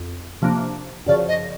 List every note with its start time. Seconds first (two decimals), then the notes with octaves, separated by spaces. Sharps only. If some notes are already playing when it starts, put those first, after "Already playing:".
Already playing: F2
0.42 C3 F3 A#3 D4
1.06 F#2 C#3 F3 D5
1.28 D#5